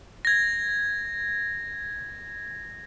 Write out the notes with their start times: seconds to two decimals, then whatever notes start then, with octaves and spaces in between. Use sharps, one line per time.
0.25 G#6 A#6